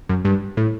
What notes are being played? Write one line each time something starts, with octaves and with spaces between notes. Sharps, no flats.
F#2
G2
A2